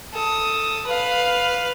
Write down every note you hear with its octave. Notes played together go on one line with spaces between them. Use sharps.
A4 D#6
B4 F5